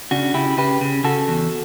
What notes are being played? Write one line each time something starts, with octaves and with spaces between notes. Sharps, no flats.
C#3 D4 F#4
C#3 E4 G4
C#3 G4 B4
C#3
C#3 F#4 A4
E2